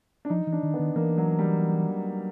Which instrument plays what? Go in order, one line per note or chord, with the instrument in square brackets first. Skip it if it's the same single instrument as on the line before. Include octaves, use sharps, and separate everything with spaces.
[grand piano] D4
[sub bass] F3 [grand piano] D#4
[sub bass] E3
[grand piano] D4
[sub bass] D#3
[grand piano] B3
[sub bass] D#3
[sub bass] E3 [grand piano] A#3
[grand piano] F#3
G3